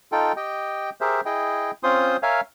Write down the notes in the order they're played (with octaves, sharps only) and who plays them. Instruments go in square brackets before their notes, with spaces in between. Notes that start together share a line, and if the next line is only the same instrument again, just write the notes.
[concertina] D#4 F4 A4 G5
G4 D#5 G5
G4 G#4 A#4 C5 E5
E4 G#4 D#5 G5
C4 C#4 F4 C5 C6 D#6
A#4 C#5 E5 F5 G#5